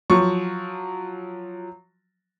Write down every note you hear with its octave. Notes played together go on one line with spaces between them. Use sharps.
F3 F#3 C#6